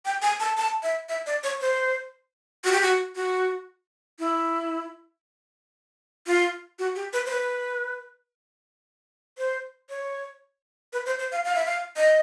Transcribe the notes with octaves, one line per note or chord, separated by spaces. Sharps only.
G5
G#5
A5
A5
E5
E5
D5
C#5
C5
F#4
G4
F#4
F#4
E4
F4
F#4
G4
B4
C5
B4
C5
C#5
B4
C5
C5
F5
F5
E5
F5
D#5